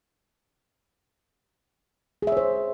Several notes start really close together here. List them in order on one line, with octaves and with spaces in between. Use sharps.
G#4 E5 C#5 C5